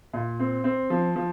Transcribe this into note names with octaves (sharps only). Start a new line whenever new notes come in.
A#2
C4
C4
F3
F3